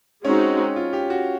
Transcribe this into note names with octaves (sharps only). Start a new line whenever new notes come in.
G#3 C4 C#4 D#4 F#4
F4
G4
F#4